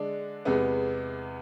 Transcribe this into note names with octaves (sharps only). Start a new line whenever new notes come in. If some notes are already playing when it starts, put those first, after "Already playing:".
Already playing: D3 G#3 D4
E2 C3 G#3 B3